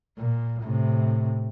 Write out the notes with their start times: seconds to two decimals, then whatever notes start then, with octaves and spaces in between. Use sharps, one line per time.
0.18 A#2
0.63 A2 C3